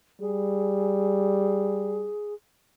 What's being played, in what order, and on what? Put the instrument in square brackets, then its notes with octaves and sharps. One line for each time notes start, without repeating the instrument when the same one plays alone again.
[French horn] G3 [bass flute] G#4